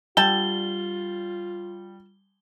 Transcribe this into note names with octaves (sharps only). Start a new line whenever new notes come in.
D3 G3 F4 G5 A5 G7